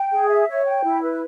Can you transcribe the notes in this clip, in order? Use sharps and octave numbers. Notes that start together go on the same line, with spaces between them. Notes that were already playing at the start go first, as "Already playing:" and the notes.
Already playing: G5
G#4
E5
C#5
G5
E4
B4